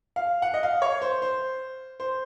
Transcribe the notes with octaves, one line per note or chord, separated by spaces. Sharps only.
F5
F#5
D#5
F5
C#5
C5
C5
C5